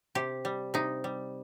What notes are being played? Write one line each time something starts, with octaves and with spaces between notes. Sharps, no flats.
C3 G4
G3
C3 D#4
G3